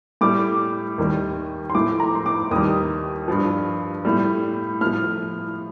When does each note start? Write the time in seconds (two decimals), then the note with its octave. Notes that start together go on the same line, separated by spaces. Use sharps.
0.21 A2 G3 D6
0.98 D#2 D#3 G3
1.70 C6
1.74 A2 F3 D6
2.00 A#5
2.15 C6
2.26 D6
2.51 D#2 D#3 G3 D#6
3.28 G2 F3
4.05 A2 G3
4.81 A2 F3 F6